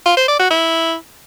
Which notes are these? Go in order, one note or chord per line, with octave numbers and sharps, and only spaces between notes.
F4
C5
D5
F#4
E4